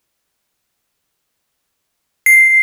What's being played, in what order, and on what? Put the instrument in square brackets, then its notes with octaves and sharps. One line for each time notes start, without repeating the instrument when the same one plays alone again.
[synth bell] C7